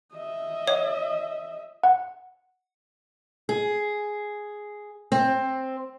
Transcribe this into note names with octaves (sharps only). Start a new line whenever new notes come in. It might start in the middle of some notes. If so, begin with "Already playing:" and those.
D#5 E5
C#5
F#5
G#4
C4